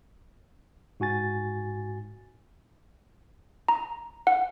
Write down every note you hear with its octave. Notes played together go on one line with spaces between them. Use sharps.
G#2 F#4 G#5 A6
A#5
F#5